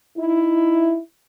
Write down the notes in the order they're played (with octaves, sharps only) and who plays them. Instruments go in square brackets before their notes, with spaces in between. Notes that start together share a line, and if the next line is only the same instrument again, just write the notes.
[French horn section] D#4 E4